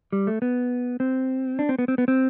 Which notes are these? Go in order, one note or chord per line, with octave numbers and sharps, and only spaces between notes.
G3
A3
B3
C4
D4
C4
B3
C4
B3
C4